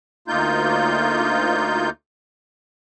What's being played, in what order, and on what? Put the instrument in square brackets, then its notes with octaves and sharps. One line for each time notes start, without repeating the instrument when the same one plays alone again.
[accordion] D2 A#3 D#4 F4 G6